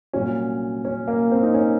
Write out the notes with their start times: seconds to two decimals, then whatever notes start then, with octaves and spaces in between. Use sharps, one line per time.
0.13 C2 A#2 F#3 C#4
0.85 C#4
1.08 A#3
1.32 C4
1.43 D#4
1.54 C#4